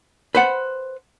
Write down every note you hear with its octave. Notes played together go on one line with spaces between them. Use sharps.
B4 C5 F#5